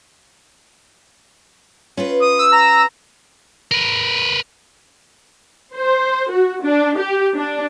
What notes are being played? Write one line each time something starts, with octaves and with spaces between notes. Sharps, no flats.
C#4 F4 B4
D#6
E6
A#5
A#4 B4
C5
F#4
D4
G4
D4